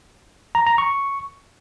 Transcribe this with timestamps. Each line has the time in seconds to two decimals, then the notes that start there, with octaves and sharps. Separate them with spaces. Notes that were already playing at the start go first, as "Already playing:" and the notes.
0.55 A#5
0.67 A#5
0.78 C#6